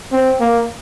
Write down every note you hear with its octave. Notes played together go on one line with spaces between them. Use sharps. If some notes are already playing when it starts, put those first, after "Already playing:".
C4
A#3